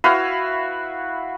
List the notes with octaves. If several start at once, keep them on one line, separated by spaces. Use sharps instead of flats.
E4 F#4 B4 F5